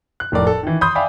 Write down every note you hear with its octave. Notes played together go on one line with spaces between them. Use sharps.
F#6
F1 A2 A#4 D5
A4
D#3 E3
B5 C6 D#6 G6
D5 E5 F5 G5 G#5 B5